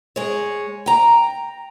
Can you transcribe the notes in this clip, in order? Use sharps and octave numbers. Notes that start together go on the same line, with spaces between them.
G#3 C#5
G5 A#5